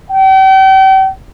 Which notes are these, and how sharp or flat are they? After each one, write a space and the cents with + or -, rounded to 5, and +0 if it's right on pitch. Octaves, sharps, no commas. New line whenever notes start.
G5 -40